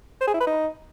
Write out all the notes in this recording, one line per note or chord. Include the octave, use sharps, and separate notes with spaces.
C5
G#4
E4
B4
D#4